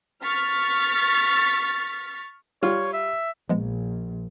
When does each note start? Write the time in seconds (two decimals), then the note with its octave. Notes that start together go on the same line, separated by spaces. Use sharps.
0.22 C#6 F6 A6 B6
2.63 G3 F4 C#5
2.93 E5
3.49 A#1 F3 G#3 B3